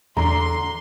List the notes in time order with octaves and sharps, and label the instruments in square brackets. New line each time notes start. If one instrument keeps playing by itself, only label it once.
[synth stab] E2 [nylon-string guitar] D3 [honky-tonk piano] A#5 [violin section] C6